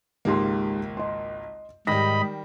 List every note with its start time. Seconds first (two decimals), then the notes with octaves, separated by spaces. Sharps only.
0.25 G#1 C#2 G#2 A#3 G4 C6
0.97 D#5 C6
1.87 G#2 D#3 G3 D#5 B5 A#6